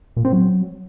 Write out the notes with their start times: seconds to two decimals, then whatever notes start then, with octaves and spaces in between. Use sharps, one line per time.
0.17 A#2
0.25 C4
0.33 F#3